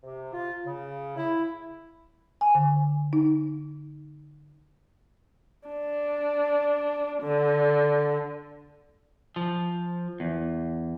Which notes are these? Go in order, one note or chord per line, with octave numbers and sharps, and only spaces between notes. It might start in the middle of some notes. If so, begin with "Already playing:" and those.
C3
F4
C#3
E4
G#5
D3
D#4
D4
D3
F3
E2